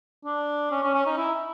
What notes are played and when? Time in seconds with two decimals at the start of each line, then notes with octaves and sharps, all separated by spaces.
0.25 D4
0.71 C#4
0.83 C#4
0.95 C#4
1.06 D#4
1.17 E4